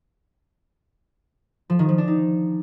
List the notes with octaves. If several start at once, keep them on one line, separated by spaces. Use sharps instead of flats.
F3
D#3
F3
D4
D#4